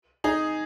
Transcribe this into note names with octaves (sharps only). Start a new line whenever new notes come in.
D#4 G#4